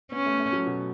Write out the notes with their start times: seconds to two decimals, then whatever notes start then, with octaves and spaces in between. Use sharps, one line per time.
0.12 B3 C#4
0.26 A3
0.39 A3
0.53 F#3
0.66 B2